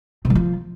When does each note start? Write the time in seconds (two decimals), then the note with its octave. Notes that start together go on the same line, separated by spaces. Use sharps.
0.25 C3
0.30 G3
0.35 F3